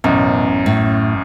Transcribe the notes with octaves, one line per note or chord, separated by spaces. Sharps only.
A1 F#2 B2
A2